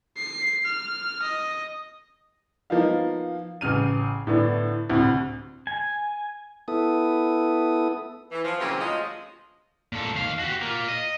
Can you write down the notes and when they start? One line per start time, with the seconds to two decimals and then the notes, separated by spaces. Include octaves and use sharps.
0.17 C7
0.65 F6
1.22 D#5
2.70 F3 A#3 B3 D#4 F5
3.61 A1 C#3 F6 D#7
4.27 A2 D3 B3 D4 E4
4.89 D2 A2 C3
5.67 G#5
6.68 B3 E4 A4 D#6
8.31 E3
8.44 F3
8.59 A#2 C#3 E3 F#3 C4 C#4
8.80 D2 F3 F#3 G#3 D#5
9.92 A#2 A4
10.14 D#2 F5
10.39 F#4 G4
10.63 A#3 F4
10.89 D#5